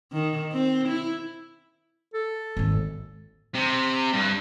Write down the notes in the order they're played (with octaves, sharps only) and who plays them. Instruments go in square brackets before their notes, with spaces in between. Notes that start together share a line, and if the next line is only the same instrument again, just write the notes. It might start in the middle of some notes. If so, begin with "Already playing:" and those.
[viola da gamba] D#3
C4
E4
[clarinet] A4
[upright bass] G#1 D#2
[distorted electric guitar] C3
G2